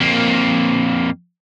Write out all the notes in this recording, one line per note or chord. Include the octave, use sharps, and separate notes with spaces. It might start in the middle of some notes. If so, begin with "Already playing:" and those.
F2 A#3